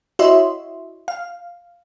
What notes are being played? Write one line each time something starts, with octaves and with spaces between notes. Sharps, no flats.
E4 F#4 C#5 D#5 E5 C6
F5